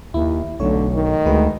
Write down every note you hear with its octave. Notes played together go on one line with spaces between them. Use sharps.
D#2 E4
B1 D3 A3 C#5
D#3
D2 G#3 B4